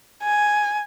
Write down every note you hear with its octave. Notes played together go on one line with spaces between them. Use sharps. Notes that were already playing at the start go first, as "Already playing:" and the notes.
G#5